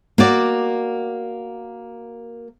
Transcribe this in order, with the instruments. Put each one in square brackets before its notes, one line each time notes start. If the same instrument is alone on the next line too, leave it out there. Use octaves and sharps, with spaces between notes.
[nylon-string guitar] A#3 F#4 D5